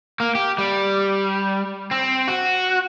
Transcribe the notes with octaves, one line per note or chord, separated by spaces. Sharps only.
A#3
G4
G3
C4
F#4